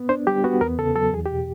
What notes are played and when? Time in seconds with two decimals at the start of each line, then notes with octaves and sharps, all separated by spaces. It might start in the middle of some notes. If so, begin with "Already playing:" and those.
Already playing: B3
0.09 D4 C5
0.27 G3 G4
0.44 B3 F#4
0.61 E2 A#4
0.78 C#3 A4
0.96 F#3 A4
1.13 E2 G#4
1.26 G4
1.31 B2